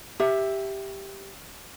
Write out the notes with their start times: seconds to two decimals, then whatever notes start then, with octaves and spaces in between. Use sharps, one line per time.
0.20 G4 E5